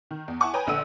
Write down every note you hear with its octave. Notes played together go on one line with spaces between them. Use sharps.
D#3
E2
E4 F#5 G#5 A5 C#6 D6
B4 C#5 G5 G#5 A#5 D#6
A#1 D3 F#5 E6 D#7